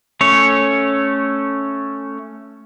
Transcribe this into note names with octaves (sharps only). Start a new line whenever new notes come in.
A3 C#4 C#5